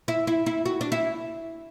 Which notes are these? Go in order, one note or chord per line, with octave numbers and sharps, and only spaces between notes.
E4
E4
E4
F#4
D4
E4